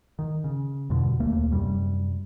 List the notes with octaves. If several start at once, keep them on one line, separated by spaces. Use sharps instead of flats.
D#3
C#3
E2 G2 B2 D3
D#1 D#2 A3 A#3
F#2 C3 G3